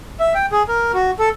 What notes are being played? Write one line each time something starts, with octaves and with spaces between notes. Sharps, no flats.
E5
G5
G#4
A#4
F#4
A4